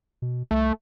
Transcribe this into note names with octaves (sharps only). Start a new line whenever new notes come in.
B2
C2 A3